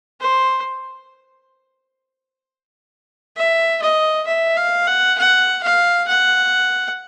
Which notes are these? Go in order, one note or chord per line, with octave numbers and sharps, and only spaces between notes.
C5
E5
D#5
E5
F5
F#5
F#5
F5
F#5